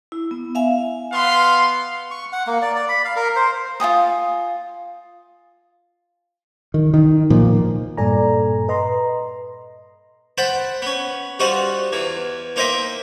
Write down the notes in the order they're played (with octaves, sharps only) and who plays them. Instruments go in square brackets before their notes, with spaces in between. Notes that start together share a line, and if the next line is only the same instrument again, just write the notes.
[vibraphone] E4
B3
E5 F5 G#5
[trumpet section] B3 F5 C6
[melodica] C#6
F#5
A#3
D5
D5
B5
F5
A#4
C5
[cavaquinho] F4 C#5 G#5 D#6
[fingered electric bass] D#3
D#3
A#2 F3
[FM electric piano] G2 A#2 A4 D5 G#5 A#5
B4 D#5 A#5 C6
[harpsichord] C5 F#5 G5 A5 B5
B3 C#4
G3 D#4 F4 F#4 C5 F#5
E2 E3
A#3 D#4 C5 D#5 E5 G5